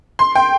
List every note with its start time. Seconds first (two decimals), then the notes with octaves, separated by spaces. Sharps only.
0.19 C6
0.35 G5